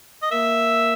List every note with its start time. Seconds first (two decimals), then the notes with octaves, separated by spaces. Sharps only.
0.23 D#5
0.31 A#3 E5